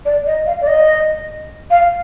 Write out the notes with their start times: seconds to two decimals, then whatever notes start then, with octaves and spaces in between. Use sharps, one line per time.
0.05 D5
0.26 D#5
0.46 F5
0.61 D5
0.67 D#5
1.70 F5